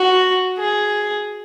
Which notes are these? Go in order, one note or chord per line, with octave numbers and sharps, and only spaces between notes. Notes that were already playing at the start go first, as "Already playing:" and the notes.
Already playing: F#4
G#4